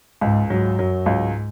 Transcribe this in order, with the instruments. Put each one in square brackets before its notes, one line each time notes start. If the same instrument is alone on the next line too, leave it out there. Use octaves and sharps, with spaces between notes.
[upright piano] C#2 [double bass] G#2
[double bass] G#2 [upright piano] F#3
[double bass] F#2 [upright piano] F#3
[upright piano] C#2 [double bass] G#2